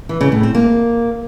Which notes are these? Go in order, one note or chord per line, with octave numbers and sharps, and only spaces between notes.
E3
C#3
A2
C4
A#3